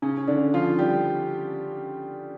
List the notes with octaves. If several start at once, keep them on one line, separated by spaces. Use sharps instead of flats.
C#3 C#4
C#4
D3 D4
F3 F4
G3 G4